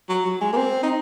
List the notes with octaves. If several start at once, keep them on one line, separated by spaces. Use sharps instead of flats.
F#3
F#3
G#3
A#3
C4
D#4